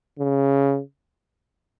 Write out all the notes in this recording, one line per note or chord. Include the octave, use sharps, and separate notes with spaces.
C#3